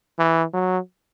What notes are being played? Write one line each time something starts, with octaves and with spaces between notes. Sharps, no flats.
E3
F#3